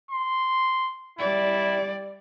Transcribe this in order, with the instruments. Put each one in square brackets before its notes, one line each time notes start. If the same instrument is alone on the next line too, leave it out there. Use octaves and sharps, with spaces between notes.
[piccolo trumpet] C6
[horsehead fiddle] G3 D5 [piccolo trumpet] E4